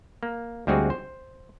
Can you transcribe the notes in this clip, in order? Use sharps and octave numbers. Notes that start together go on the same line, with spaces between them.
A#3
D2 G3 G#3 C4 F#4 G#4
C5